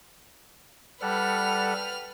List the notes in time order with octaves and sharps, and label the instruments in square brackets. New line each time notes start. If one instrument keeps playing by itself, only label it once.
[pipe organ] G3 A4 F#5 [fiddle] B4 F6